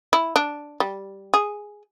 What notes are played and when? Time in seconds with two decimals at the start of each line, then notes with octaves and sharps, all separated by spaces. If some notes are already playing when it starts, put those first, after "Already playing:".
0.13 E4
0.36 D4
0.80 G3
1.34 G#4